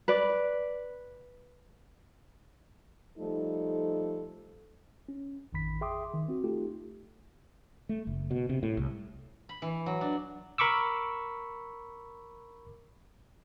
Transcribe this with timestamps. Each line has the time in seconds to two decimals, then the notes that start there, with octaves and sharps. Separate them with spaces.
0.08 B4 D5
3.18 F3 G3 A3 D#4 A4
5.09 C#4
5.53 A1 F2 D#3 B5 B6
5.81 G#4 E5 G5 C6 D6 D#6
6.14 D#3
6.28 C4 F#4
6.44 A3 D#4 F4 G4 A4
7.89 A3
8.07 F#1
8.31 B2
8.49 C3
8.63 A2
8.77 C2
9.49 B5
9.62 E3
9.86 F#3
10.01 D4
10.58 A#4 B5 C#6 D6 E6